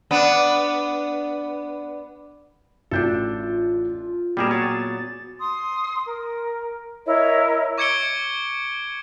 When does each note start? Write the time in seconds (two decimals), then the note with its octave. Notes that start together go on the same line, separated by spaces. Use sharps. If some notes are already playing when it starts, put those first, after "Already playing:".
0.11 B3 D4
2.91 A1 D4 F4 F#4 A4 G6
4.37 A#2 G3 B3 F#4 G#4 A#4 D6 E7
4.51 F#3 G#4 C#5 A6
5.39 C6 D#6
6.05 A#4
7.06 E4 A#4 C#5 D#5
7.78 C#6 D6 G#6 C#7 D7 G7